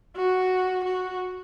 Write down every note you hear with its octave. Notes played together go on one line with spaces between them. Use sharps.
F#4
F#4